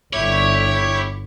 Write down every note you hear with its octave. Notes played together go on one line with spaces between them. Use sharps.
G1 E4 G4 C#5 E5